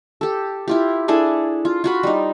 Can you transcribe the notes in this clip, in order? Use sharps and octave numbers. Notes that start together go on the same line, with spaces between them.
G4 A4
E4 F4 G4
D4 E4 G#4 A4
F4
F4 F#4 B5
G3 D#4